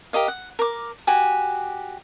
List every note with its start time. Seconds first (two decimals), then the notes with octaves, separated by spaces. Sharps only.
0.13 G4 A#4 D#5 F5
0.28 F#5
0.59 A#4 D6
1.07 F#4 G4 G#5